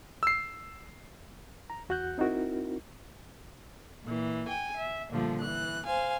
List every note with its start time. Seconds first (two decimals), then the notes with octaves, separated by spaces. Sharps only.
0.23 E6 C7
1.70 A#5
1.89 E2 F#4 F#5 F#6 G6
2.18 C4 D#4 E4 F#4 A#4
4.04 A#2 E3
4.48 G5 G#5
4.77 E5
5.10 A#2 D3 F3 G3 A3
5.40 E3 F#6
5.86 C5 F5 G#5